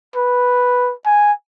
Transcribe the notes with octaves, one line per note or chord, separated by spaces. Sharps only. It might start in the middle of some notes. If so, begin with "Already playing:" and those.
B4
G#5